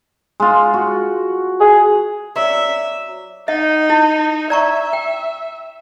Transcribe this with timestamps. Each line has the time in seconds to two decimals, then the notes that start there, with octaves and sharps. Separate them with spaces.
0.40 G#3 F4
0.74 F#4
1.60 G#4
2.36 F#3 D5 E5
3.48 D#4 D#5 F#5
3.90 E4
4.50 D5 E5 A#5 C#6
4.93 G5